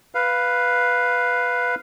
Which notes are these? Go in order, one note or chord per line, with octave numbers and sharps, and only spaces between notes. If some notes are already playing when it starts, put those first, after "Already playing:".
B4 F5